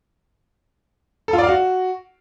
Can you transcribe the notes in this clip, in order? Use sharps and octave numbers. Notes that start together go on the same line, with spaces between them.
A4
F4
D5
F5
F#4